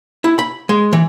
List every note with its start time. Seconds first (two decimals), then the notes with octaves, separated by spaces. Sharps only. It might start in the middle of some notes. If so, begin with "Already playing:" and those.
0.24 E4
0.39 B5
0.69 G#3
0.93 E3